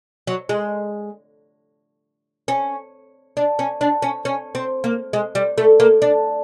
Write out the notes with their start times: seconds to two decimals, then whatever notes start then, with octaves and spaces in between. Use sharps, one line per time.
0.27 F#3
0.49 G#3
2.48 C#4
3.37 D4
3.59 C#4
3.81 D4
4.02 C#4
4.25 C#4
4.55 C4
4.84 A#3
5.13 G#3
5.35 G3
5.58 A3
5.80 A#3
6.02 D4